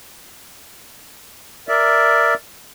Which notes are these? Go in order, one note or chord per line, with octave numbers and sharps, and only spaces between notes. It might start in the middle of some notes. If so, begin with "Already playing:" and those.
A#4 D5 E5